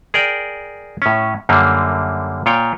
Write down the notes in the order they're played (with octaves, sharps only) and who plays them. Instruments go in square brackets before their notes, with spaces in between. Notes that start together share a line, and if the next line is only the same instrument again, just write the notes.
[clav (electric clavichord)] G#4 A#4 D5 G5
A2 C#4
F#2 D3 G3 A#3
A#2 F4 C#5 G5